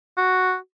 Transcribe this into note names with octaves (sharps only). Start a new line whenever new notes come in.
F#4